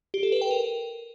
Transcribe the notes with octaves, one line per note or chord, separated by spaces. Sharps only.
G4
A4
B4
G5
A#4